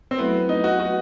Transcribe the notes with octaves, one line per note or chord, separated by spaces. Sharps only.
C4
F#3 A3 B3 E4 B4
D#4
F#4
F#4